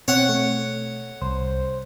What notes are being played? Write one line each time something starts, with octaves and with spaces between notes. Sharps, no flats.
B2 C4 C#5 F#5
A3
C2 C5